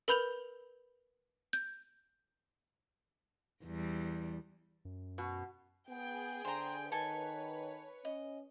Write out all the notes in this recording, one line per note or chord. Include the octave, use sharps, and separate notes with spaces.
A#4 B4 B5 G6 F7 F#7
G6
E2 G3
F#2
B2
B3 G#4 G5
D3 C5 A#5
D#3 A4 B4 C#5 G#5
C#4 D#5